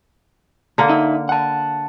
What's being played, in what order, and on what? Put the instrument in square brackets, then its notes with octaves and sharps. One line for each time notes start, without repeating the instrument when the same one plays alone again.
[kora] D3 A#3
[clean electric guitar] D#4 E5
F#5 A5